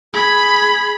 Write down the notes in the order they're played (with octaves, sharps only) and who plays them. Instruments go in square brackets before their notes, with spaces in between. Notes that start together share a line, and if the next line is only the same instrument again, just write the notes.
[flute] G#4 [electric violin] B5